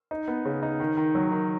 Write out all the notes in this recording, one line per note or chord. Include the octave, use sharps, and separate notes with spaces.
D#4
B3
C#3
D#4
D#3
D#3
F#3
D#3